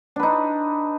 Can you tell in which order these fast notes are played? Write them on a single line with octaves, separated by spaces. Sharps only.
D4 B4 D#4